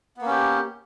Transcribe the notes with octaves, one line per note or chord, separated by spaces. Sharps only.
A#3 B3 C#4 G4